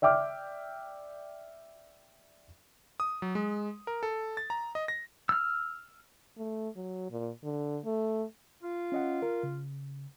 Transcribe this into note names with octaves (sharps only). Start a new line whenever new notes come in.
D5 E5 G5 D6 F6
D#6
F#3
G#3
A#4
A4
A6
A#5
D#5
A#6
E6 F6
A3
F#3
A#2
D3
A3
F4
C#4 D#5 F#5
A#4
C#3